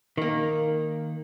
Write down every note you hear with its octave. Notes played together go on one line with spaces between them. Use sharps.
D#3 A#3